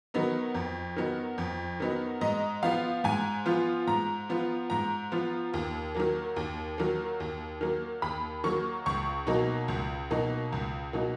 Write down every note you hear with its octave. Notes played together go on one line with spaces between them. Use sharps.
D#3 F#3 B3 D#4
F2
D#3 F#3 B3 D#4
F2
D#3 F#3 B3 D#4
G#2 D#5
F3 B3 F4 F5
G#2 G#5
F3 B3 F4
G#2 A#5
F3 B3 F4
G#2 A#5
F3 B3 F4
D#2
D#3 F#3 A#3
D#2
D#3 F#3 A#3
D#2
D#3 F#3 A#3
D#2 B5
D#3 F#3 A#3 C#6
C#2 C#6
B2 F#3 A#3 D#4
C#2
B2 F#3 A#3 D#4
C#2
B2 F#3 A#3 D#4